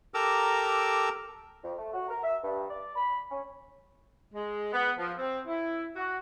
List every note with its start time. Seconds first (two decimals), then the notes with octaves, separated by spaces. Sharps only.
0.14 G4 A4 A#4 A#5 D6 E6
1.64 F2
1.78 A3
1.94 F#4
2.09 A#4
2.23 E5
2.43 G2
2.70 D5
2.95 B5
3.31 C#4
4.34 G#3
4.73 B3
4.98 F3
5.18 C4
5.46 E4
5.96 F#4